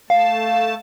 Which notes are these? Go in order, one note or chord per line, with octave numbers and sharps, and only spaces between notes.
A3 F5 A5